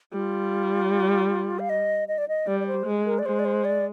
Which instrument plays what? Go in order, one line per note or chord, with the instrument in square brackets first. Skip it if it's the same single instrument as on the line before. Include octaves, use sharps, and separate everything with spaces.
[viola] G3 [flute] F4
[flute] F5
D#5
D#5
D5
D#5
[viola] G3 [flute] D5
[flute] D5
C5
[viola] G#3
[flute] A#4
D5
[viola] G#3 [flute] C5
[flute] D5
C5
D5